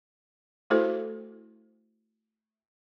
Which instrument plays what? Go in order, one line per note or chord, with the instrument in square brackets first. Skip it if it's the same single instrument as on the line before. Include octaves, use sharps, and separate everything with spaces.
[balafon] A3 E4 F#4 A4 C5